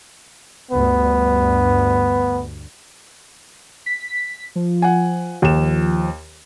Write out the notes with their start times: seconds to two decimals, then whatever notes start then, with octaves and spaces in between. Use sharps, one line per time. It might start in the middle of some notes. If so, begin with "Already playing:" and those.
0.71 D2 G2 B3
3.86 B6
4.56 F3
4.82 F#5 G#5
5.42 D#2 E7